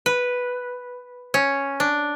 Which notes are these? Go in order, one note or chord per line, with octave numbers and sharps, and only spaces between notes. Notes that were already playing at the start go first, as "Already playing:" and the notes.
B4
C#4
D4